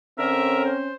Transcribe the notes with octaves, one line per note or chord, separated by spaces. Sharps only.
D3 C4 C#4 A#4 E5
C5